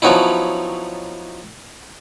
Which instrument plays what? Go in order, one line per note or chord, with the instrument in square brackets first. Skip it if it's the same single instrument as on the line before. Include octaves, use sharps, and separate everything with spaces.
[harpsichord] F3 F#3 B3 C#4 D#4 E4